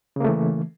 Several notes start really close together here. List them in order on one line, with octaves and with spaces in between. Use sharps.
C#3 A#3 A3 E3